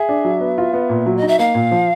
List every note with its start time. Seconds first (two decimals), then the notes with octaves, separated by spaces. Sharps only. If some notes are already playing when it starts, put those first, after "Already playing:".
Already playing: G#4 E5
0.09 D4
0.25 F#3
0.41 B3
0.58 F4
0.74 B3
0.90 A#2
1.06 F#3
1.17 D#5
1.22 D#4
1.28 E5
1.39 A#3 F5
1.55 A#2
1.71 F3